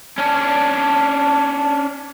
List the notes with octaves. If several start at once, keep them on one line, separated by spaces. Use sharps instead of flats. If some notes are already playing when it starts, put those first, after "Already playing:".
C#4 D4